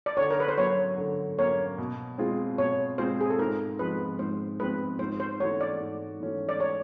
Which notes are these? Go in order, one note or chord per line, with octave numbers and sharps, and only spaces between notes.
D5
D3 C#5
A#4
B4
C5
F#3 A#3 C#4 C#5
D3
F#3 A#3 C#4 C#5
B2
G#3 C4 F4 G#4
B2 C#5
G#3 C4 F4 G#4 C5
G#4
A4
G#2 A#4
F3 G#3 C4 B4
G#2 C5
F3 G#3 C4 B4
G#2 C5
C5
E3 A3 C#4 F#4 C#5
D5
G#2
E3 A3 C#4 F#4
D5
C#5